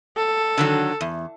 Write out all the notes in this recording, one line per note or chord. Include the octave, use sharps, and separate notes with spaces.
A4
D3 D#3 F#3
E2